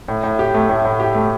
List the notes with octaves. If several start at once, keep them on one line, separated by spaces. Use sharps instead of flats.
A2
A2
G4
A3
A2
A2
G4
A3